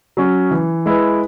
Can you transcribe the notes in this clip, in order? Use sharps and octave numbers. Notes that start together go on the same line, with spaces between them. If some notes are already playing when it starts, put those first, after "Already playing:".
F#3 C#4
E3
G#3 E4 B4